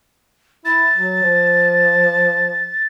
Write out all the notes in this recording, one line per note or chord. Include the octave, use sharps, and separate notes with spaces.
E4 A6
F#3
F3